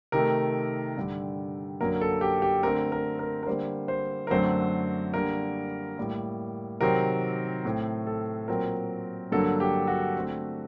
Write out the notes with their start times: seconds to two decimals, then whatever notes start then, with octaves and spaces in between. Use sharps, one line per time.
0.12 C3 D#3 A3 A#4
0.97 G2 D3 G3
1.81 F#2 D3 F#3 A#3 A#4
2.01 A4
2.21 G4
2.42 G4
2.63 D3 A3 C4 A#4
2.92 A#4
3.19 A#4
3.43 A#4
3.47 D3 G3 A#3 C5
3.88 C5
4.27 A#4
4.30 F#2 D3 F#3 A3 C4 C5
5.14 D3 G3 A#3 A#4
5.98 A2 G3 A#3
6.81 C3 D#3 F#3 C4 A#4
7.65 A2 A3 C4
8.07 A4
8.48 A#2 F#3 C4 A#4
9.32 G2 D3 F#3 A#3 A4
9.60 G4
9.87 F#4
10.16 D3 A3 C4